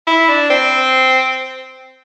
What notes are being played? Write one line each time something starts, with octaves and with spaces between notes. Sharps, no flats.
E4
D4
C4